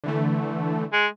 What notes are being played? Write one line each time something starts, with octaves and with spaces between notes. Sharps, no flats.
D3 E3 A3
G#3